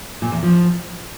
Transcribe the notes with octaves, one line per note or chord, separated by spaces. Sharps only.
A#2
E2
F3